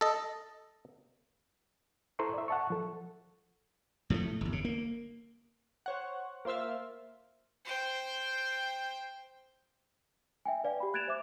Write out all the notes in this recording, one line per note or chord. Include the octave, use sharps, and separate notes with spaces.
A4 D#5
E4 A4 C5 A#5 C6 C#6
D5 E5
F#5 A5 C#6
F3 A4
A2 F3 G3 A3
G1 E2
C#3
A#3
C5 C#5 F#5
A#3 F4 C5 E5 F5
C5 G5
E5 G5 G#5
B4 D5 F5 G#5
G4 B5
F#6 G#6 A6 D7 E7 F7
C5 E5 D6